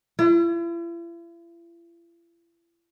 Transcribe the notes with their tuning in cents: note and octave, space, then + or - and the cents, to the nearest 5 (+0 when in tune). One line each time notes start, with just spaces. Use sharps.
E4 +45